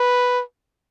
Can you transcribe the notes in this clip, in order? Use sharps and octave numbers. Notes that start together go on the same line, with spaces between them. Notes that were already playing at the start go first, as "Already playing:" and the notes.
Already playing: B4